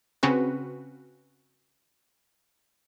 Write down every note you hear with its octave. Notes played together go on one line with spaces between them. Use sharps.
C#3 C4 C#4 F#4 B4